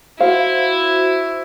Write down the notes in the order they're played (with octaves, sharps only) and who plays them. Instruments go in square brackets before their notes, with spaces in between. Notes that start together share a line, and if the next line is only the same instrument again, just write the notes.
[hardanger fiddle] E4 [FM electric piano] F#4 C5 [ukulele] F5